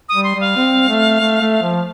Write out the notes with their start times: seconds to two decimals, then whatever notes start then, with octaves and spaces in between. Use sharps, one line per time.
0.09 D#6
0.14 G3
0.24 C6
0.35 G3
0.41 F5
0.56 C4
0.89 A3
1.20 A3
1.41 A3
1.62 F3